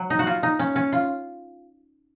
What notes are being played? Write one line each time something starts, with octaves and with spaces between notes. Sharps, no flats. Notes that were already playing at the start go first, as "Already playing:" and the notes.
Already playing: F#3
D#4
F#4
F4
D#4
C#4
C#4
F4